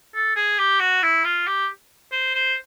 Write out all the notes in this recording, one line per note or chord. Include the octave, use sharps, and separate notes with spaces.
A4
G#4
G4
F#4
E4
F4
G4
C5
C5